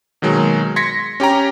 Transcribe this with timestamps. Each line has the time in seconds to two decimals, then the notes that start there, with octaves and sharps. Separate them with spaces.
0.22 B2 D#3 F#3 G#3 A#3
0.76 C6 G#6 A#6 B6 C#7
1.20 C#4 G4 G5 A#5